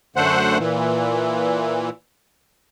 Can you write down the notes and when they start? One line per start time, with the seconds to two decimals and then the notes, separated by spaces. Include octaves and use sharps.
0.16 F#2 D3 A3 C5 F#5
0.59 A#2 E3